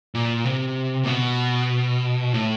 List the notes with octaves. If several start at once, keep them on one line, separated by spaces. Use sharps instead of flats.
A#2
C3
A#2
B2
A2